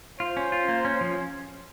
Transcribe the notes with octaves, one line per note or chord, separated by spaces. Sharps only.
F4 C5
C#4
F4
A#3
C#4
F3